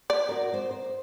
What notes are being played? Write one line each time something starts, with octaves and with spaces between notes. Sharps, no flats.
D5
F#4 A#4
B3 C5
C5